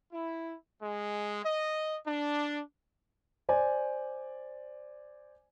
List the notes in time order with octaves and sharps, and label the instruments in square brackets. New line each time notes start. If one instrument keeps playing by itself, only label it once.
[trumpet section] E4
G#3
D#5
D4
[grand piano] C5 D5 G#5